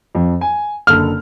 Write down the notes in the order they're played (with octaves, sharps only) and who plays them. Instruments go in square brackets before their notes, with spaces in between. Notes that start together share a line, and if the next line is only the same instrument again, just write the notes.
[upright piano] F2
G#5
[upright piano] F#1 D3 A4 [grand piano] F6